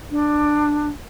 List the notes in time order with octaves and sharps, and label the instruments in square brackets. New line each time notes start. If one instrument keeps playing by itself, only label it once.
[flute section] D4